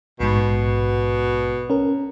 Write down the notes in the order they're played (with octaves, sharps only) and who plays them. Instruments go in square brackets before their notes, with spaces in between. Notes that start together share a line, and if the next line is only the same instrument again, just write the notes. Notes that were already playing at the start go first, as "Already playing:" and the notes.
[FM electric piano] A#1 G#2 [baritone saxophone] B2
[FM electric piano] C#4 A#4